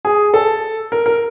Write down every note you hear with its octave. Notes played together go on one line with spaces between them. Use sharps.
G#4
A4
A#4
A#4